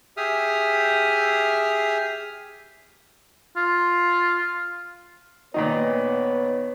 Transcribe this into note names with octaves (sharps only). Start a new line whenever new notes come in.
G4 G#4 E5 D#6 F6
F4
A#2 D#3 B3 D#4 B4 C#5